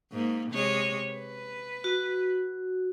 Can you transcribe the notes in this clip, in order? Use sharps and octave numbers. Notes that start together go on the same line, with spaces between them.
G#2 A#3
C3 G#3 C#5
B4
F#4